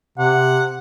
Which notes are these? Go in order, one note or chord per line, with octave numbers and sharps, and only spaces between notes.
C3 F#5